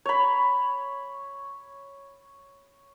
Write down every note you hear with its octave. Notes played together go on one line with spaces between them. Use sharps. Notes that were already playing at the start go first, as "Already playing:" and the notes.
C#5 B5